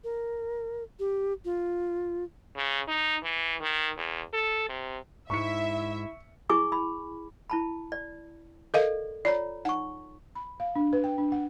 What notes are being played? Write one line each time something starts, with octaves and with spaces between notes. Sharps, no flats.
A#4
G4
F4
C#3
D#4
E3
D#3
E2
A4
C3
G#2 E4 E5 C#6 C#7
E4 G#4 G#5 C#6 D6
B5
E4 A5 B5
D5
A4 A#4 D5 D#5 F5
F4 C#5 D5 A#5
D#4 F#5 C#6
B5
F5
D4
B4
G5
D4
F#5